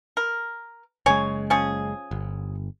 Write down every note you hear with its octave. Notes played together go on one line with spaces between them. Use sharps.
A#4
F#1 C#3 G#3 C#5 G#5
F3 C#4 G#4
G1